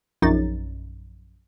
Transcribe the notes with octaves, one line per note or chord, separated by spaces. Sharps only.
A#1 F#2 D#4 A6